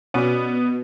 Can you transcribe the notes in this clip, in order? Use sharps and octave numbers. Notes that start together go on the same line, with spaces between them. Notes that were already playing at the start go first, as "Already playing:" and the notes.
B2 B3 C#4 F#4 D5